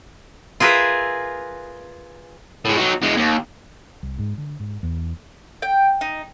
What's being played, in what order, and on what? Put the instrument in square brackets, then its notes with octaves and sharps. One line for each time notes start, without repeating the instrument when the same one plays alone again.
[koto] F4 G#4 A#4 B4 E5
[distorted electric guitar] A2 G#3
F#3 D#4
E2 G#3
D#2
[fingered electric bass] C2
G#2
D3
G#2
E2
[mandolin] G5
D#4